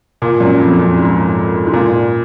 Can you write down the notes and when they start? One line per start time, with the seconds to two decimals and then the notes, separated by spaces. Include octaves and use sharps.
0.22 A#2
0.41 F#2
0.60 F2
0.78 F#2
0.98 G#2
1.67 G#2
1.73 A#2